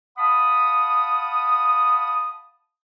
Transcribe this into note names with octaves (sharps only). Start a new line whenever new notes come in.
F5 F#5 A5 B5 D#6